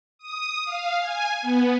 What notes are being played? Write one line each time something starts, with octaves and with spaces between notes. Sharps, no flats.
D#6
F5
G#5
B3